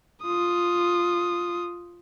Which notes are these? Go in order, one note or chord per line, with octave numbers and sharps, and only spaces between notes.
F4 D#6